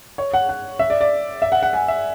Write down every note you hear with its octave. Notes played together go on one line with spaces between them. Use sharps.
C#5
F#5
F#5
E5
D5
D5
E5
F#5
F#5
G#5
E5